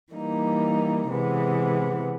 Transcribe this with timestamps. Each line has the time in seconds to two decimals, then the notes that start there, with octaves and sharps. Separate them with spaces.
0.13 E3 G3 A#3 D#4
1.09 C3 E3 G#3 B3